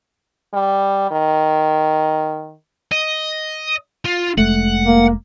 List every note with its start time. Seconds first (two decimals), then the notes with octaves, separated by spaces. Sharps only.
0.54 G3
1.11 D#3
2.92 D#5
4.05 F4
4.38 F1 G#3 A3 F#5
4.84 A#3